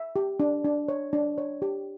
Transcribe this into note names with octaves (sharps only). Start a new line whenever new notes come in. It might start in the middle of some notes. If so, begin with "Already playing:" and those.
Already playing: E5
G4
D4
D4
C#5
D4
C#5
G4